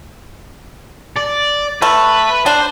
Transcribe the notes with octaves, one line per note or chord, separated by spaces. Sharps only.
D5
A3 B4
D4 C5